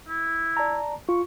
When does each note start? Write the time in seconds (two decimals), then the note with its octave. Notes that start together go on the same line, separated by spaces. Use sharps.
0.08 E4
0.57 D5 A5 A#5
1.09 F4 C#6